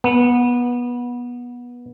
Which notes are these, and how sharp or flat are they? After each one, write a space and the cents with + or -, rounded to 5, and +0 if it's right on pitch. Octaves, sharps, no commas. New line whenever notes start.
B3 -20